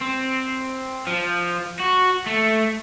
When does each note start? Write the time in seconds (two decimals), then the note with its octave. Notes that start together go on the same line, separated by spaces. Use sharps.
0.01 C4
1.07 F3
1.80 F#4
2.26 A3